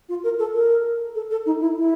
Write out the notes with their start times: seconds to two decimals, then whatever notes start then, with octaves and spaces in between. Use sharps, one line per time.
0.09 F4
0.24 A#4
0.39 A4
0.55 A#4
1.15 A4
1.31 A4
1.46 D#4
1.60 E4
1.76 E4